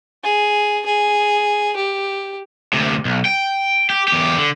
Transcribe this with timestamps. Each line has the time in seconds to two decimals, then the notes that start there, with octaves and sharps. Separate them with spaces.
0.23 G#4
0.86 G#4
1.76 G4
2.73 D2 C3
3.05 B1
3.25 G5
3.90 G4
4.08 E2 G4
4.38 D3